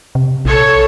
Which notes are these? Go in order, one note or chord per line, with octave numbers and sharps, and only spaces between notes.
C3
A#1 A4 C#5